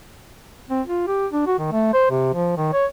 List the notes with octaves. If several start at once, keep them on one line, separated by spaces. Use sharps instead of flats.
C4
F4
G4
D4
F#4
D#3
A3
C5
C3
F3
D#3
C#5